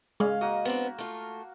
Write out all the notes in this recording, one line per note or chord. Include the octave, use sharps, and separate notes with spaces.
G#3 C#4 F5
A#3 F#4 D#5
B3 C4 D4
A3 F4